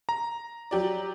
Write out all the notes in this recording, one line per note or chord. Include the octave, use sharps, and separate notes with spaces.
A#5
F#3 G4 D5